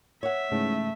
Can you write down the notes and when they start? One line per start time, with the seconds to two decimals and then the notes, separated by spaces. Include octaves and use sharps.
0.23 C#5 E5 F#5
0.52 G#2 C#3 E3 A3